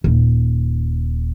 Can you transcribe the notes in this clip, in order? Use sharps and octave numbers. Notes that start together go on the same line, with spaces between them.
D#1